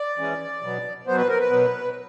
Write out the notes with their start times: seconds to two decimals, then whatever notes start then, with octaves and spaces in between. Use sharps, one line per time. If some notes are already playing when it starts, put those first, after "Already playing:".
Already playing: D5
0.18 E3 G#3 C#4
0.62 B2 F#3 B3
1.06 B2 F#3 B3 C5
1.18 B4
1.29 A#4
1.40 B4
1.51 B2 F#3 B3